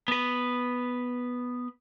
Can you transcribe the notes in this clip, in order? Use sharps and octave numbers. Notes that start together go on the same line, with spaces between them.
B3 B4